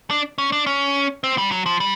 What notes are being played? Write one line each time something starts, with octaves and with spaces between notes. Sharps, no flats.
D4
C#4
D4
C#4
C4
G3
F#3
F3
G3